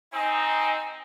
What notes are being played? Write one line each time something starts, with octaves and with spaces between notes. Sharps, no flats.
C4 D#4 G#5